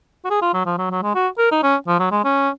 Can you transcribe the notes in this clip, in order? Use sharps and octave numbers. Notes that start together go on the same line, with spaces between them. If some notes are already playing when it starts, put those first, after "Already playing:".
F#4
G#4
F4
F#3
F3
F#3
F#3
G#3
F#4
A#4
D#4
C#4
F3
F#3
G#3
C#4